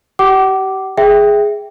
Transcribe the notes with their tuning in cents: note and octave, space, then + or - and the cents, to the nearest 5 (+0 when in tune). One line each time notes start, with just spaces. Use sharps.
G4 -25 F#5 +45 D6 +0
G#4 +0 E5 +0 G5 +0